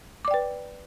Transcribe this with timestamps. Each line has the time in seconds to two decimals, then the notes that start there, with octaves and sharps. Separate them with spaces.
0.25 D6
0.28 D5
0.31 G5
0.34 B4